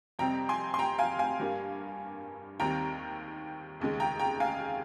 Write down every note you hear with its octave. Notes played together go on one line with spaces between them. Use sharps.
F2 C3 G3 C4 G5 A#5
G#5 C6
C6
G5 A#5
F5 G#5
F5 G#5
G2 G3 A#3
D#2 D#3 G3 C4 G5 A#5
F1 D#2 C#3 G#3
G5 A#5
G5 A#5
F5 G#5